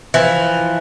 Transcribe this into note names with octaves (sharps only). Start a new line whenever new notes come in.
E3 F3